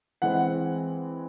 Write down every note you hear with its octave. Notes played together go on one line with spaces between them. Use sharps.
E3 G#3 C4 F#5